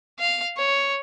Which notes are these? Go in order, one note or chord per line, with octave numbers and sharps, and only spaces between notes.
F5
C#5